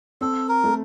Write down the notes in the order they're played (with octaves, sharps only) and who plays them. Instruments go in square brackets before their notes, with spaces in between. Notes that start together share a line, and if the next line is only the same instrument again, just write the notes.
[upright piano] C4 [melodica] A4
[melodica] A#4
[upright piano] A3